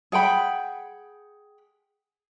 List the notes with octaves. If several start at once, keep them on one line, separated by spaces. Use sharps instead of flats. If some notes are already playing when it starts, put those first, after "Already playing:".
G#4 F#5 G5 B5